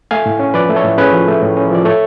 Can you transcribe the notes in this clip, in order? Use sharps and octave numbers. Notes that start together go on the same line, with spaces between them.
A3 F5 G#5
A2
C#4
F3 B4 D5
A3
A4 C#5
A2
C#4 G#4 B4
F3
A3
A2
C#4
F3 D5
A3 A4 C#5